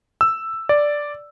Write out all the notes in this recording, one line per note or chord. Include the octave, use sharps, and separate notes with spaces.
E6
D5